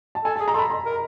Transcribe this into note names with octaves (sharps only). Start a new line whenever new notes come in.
A5
A4 G#5
A5
G#4
A#5
A4 B5 C6
C6
A#4